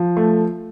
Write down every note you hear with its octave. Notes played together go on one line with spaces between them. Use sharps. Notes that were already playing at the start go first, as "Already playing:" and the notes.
Already playing: F3
A3